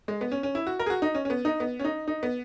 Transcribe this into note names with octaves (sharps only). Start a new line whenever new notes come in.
G#3
B3
C#4
C#4
E4
F#4
A#4
G#4
F#4
D#4
C#4
C#4
B3
D#4
B3
C#4
D#4
D#4
B3